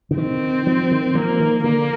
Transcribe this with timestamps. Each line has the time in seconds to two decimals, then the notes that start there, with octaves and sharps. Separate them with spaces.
0.11 D3
0.17 D#3 C4
0.67 F3
0.91 D#3
1.15 F3 A#3
1.40 D#3
1.64 D3 A#3